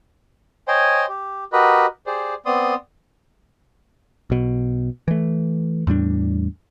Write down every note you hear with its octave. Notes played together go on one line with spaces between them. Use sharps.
C5 C#5 D#5 G5 G#5 C6
G4
F#4 G4 A#4 B4 D#5 B5
G4 G#4 C5 D5
B3 C4 D5 C6 D#6
B1 B2
E3 A3
E2 A2 G3 D4